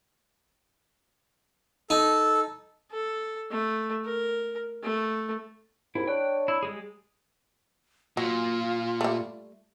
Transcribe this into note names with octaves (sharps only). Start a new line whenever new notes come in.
D#4 A4
A4
A3
A#4
A3
D#2 G#2 E4
D4 C#5 G5 F#6
E4
G3 G#3 G#4
A#2 F#3 F4
G3 A3